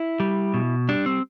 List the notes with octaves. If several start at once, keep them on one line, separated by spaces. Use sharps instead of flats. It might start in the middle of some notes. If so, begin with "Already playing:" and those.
Already playing: E4
G3
B2
G3 D4
C4